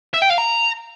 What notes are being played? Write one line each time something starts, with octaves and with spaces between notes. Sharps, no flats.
E5
G5
F5
A#5